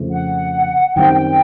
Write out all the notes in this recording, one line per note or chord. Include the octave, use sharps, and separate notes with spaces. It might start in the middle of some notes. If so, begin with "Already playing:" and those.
Already playing: F2 C#3 F3 A3
F#5
F#2 D#3 G3 C4 G5
G5